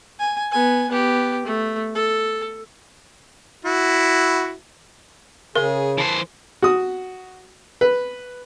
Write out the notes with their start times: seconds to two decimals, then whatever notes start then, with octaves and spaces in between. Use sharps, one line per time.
0.20 G#5
0.52 B3 G#5
0.90 B3 G4
1.46 A3
1.95 A4
3.65 E4 F#4
5.55 C#3 G#4 A#4
5.98 E3 C5 A5
6.62 F#4 D#6
7.81 B4